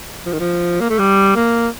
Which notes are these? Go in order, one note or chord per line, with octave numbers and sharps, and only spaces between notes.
F3
D#3
F3
A#3
A3
G3
A#3